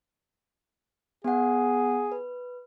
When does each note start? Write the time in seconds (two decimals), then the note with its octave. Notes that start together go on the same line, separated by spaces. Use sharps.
1.24 B3 G#4 F#5
2.12 B4